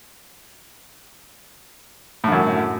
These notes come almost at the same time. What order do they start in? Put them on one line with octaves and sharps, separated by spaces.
A2 D3 F#2